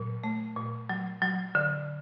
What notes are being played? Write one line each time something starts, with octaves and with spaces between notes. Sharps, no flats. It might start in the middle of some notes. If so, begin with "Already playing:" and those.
Already playing: A#2 F#3
A3
A#2
F#3
F#3
D3